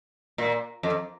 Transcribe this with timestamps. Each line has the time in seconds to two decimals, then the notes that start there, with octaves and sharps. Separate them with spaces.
0.38 A#2
0.83 F2